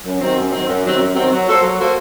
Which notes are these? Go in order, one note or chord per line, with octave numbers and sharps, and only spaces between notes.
F#2
D#3 F#3 C4
F#2
D#3 F#3 C4
F#2
D#3 F#3 C4
F#2
D#3 F#3 C4
F#3
A#3 F#4 A4 C5
F#3
A#3 F#4 A4 C5